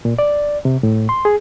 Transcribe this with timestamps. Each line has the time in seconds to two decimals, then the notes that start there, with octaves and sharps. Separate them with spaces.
0.05 A#2
0.19 D5
0.65 C3
0.83 A2
1.09 C6
1.25 G#4